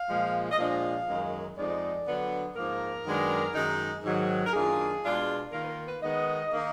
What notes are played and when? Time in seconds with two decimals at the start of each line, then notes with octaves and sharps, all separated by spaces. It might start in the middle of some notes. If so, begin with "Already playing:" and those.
Already playing: F5
0.09 A#2 F3 G#3
0.51 D#5
0.58 A#2 F3 G#3 D4 F4 F5
1.07 F#2 D#3 G#3 D#4
1.57 F2 F3 G#3 D#4 D5
2.07 D3 F#3 B3 D4
2.56 G#2 F3 A#3 A#4
3.06 F#2 D#3 G#3 B3 D4
3.54 F#2 D#3 G#3 D#4
4.04 G#2 D#3 F#3
4.46 A#4
4.53 F#2 D#3 A#3 D4 F4 G#4
5.02 B2 G#3 D4 F4
5.52 D#3 A#3 F4 A#4
5.62 B4
5.68 A#4
5.86 B4
6.02 D#3 G#3 B3 D#5
6.52 D#3 A#3 D#4